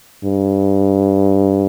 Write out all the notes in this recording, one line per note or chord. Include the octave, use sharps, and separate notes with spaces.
G2